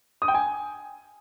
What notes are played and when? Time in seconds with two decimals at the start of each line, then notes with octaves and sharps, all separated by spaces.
0.22 D#6
0.28 G5
0.34 G#5